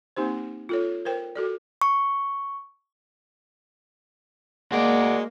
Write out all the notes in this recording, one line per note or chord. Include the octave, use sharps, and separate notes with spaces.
A#3 C4 D#4 G4 C5
F4 A4 C#5
A#4 C5 G5
F#4 A4 D5
C#6
G#3 A#3 F#4 D5